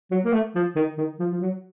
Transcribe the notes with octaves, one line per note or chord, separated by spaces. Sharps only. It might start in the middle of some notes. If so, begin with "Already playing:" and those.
F#3
A#3
A3
F3
D#3
D#3
F3
F3
F#3